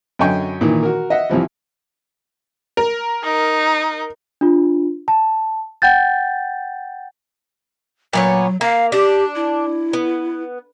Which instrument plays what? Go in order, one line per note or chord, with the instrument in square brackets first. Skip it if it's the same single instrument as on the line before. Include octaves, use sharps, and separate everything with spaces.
[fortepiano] F#2 D3 D#5 G5 G#5 C#6
A#2 D#3 E3
F#4 A#4
D#5 E5 F#5
C2 E3 F3 G3
[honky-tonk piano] A#4
[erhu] D#4
[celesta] D4 F4
A5
F#5 G5 G6 A6
[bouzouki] A#2 B3 C#5 [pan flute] F#3
[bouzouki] A#3 [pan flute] F5
[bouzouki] D4 [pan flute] G4
[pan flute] E4
[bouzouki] B3